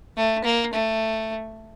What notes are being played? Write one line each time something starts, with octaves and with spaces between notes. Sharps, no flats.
A3
A#3
A3